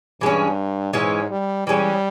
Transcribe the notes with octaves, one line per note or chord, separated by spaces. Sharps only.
G2 E3 G#3 C#4
G#2 E3 G#3 C#4
G3
E3 G3 G#3 C#4